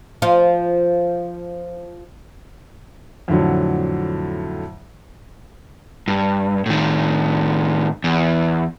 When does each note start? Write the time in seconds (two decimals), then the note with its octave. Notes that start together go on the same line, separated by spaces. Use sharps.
0.22 F3 F4
3.28 F2 A2 D3 F#3
6.08 G2
6.66 A2 D#3
8.04 E2